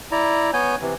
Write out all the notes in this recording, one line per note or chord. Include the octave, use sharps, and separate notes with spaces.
E4 D5 A#5
B3 C#5 G#5 G6
C3 E3